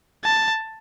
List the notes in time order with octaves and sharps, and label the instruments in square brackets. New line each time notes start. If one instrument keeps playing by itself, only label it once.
[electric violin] A5